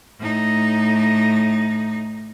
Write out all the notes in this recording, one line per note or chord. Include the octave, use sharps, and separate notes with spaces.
A2 D#4